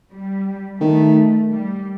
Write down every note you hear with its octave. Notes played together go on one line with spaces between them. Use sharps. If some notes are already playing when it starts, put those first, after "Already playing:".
G3
D#3 A3
G3